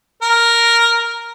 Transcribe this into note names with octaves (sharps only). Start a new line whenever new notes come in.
A#4